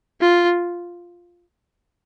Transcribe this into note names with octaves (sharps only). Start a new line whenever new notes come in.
F4